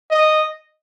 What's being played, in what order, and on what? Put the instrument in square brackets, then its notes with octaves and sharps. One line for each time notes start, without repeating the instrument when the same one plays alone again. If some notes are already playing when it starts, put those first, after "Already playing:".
[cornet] D#5